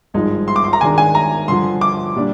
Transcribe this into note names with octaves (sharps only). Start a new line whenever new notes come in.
G#1 G2 F3 G#3 D#4
C6
D6
C6
A#5
G#2 D#3 G#3 D4 G#5
G#5
A#5
G2 D3 F3 C6
D6
A#2 G3 D4